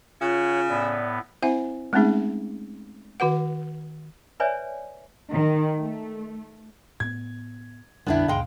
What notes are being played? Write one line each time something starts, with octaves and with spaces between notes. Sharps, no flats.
C#3 F4 C#5 F#5
A2 B3 D5
C4 E4 C5 E5 G#5
G#3 A3 C4 C#4 D#4 G#4
D#3 F#4 B4 F#5
B4 C#5 D5 E5 G#5
D#3
A3
A2 B3 G#6
A#1 F2 D3 G3 B3 D4 E4 G5
D#2 G#2 B2 G#3 F5 G5